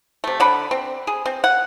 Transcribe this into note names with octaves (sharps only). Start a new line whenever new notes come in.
C3 A3
D3 F#5 B5
C4
G#4
C4
F#5